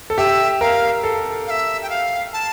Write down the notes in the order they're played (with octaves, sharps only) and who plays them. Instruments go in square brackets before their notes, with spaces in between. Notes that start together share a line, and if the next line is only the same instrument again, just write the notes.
[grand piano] A4
[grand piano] G4 [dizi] E5
[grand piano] A#4 [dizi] F5
[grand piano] A4
[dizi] F5
E5
G5
F5
A5